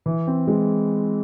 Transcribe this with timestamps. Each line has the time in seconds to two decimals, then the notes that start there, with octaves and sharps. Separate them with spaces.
0.06 E3
0.27 C4
0.47 G#3